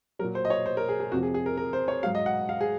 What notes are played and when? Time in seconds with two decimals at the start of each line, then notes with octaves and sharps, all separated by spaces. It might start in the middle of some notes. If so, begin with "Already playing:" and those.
0.19 F#3 A#4
0.24 A#2
0.35 C5
0.45 D#5
0.50 C#5
0.66 C5
0.77 A#4
0.89 G#4
1.00 G#4
1.12 F2 C3 F3 F#4
1.23 G#4
1.34 G#4
1.46 A#4
1.57 A#4
1.73 C5
1.88 C#5
2.03 G#2 F#3 F5
2.15 D#5
2.26 F#5
2.49 F5
2.61 G#4